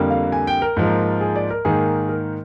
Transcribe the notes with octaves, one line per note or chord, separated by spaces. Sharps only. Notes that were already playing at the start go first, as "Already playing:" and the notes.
Already playing: F2 D3 G3 A#3
F5
G#5
G5
A#4
G#2 F3 A#3
G#4
D5
A#4
G#2 D#3 A#3 G#4
A#4